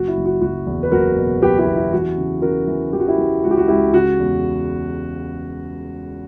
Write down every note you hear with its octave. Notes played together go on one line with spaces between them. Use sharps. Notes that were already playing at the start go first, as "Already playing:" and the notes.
Already playing: F#1 F#4
E4
F#1
F#4
F#1 F#4
E2
B4
F#1 F#4 A#4
B2
F#1 G4 B4
E4 G4
E2
E4
E3 F#4
C#3
C#3 F#4 A#4
E3
E3 G4
F#4
E4 G4
E3
C#2 F#4
G4
F#4
C#2 E4 G4
C#3 F#4
E2